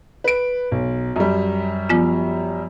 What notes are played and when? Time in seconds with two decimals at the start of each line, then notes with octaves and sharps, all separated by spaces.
0.24 B4 D7
0.71 B1
1.16 F#2 G3
1.89 F3 B3 F4